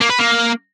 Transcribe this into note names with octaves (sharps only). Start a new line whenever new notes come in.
A#3
B4
A#3